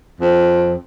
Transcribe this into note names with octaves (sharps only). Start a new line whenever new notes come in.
F2